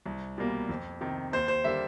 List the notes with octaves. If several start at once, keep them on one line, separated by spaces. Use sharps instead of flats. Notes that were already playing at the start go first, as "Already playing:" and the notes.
C2
B2 G3 A#3
F2
C3 D#3
D#2 C5
C5
D3 G3 A#3 E5